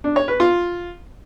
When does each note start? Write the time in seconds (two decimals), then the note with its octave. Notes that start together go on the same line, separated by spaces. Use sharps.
0.04 D4
0.16 C#5
0.28 B4
0.40 F4